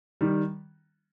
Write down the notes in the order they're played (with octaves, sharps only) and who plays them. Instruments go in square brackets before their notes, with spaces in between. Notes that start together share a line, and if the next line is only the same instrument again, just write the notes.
[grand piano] D#3 G3